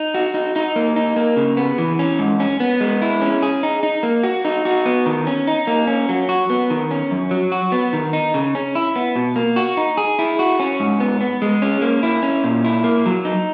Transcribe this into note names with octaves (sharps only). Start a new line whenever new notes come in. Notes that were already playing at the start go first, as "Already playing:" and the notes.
Already playing: D#4
F#4
D#4
D#4
A#3
D#4
A#3
C#3
B3
E3
C#4
G#2
C#4
B3
G#3
E4
C#4
G#4
D#4
D#4
A#3
F#4
D#4
F#4
B3
D#3
C#4
D#4
A#3
C#4
F#3
F#4
B3
D#3
C#4
F#2
F#3
F#4
B3
D#3
D#4
C#3
C#4
E4
B3
B2
A#3
F#4
D#4
G#4
E4
F#4
C#4
G#2
B3
B3
G#3
C#4
A#3
E4
C#4
A#2
E4
A#3
F#3
D#4